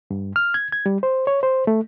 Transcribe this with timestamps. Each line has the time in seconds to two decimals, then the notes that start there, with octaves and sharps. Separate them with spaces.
0.11 G2
0.36 F6
0.54 G#6
0.72 G#6
0.86 G3
1.03 C5
1.27 C#5
1.43 C5
1.67 A3